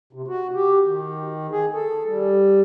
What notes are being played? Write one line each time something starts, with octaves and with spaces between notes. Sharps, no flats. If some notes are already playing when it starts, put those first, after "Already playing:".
C3
F#4
G4
D#3
G#4
A4
G3